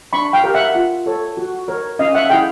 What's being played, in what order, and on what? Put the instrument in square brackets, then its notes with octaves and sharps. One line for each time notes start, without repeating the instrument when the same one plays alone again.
[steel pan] D4 B5 C#6
F5 G5
G4 A#4
E5 F#5
F4
A4 C#5
F#4
A#4 C#5
C#4 D#5 F5
E5 F#5
E4 G#4 F5 G5